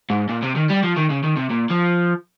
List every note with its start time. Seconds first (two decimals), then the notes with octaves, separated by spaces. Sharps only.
0.10 G#2
0.29 A#2
0.43 C3
0.56 D#3
0.70 G3
0.83 F3
0.97 D#3
1.10 C#3
1.24 D#3
1.37 C3
1.50 A#2
1.71 F3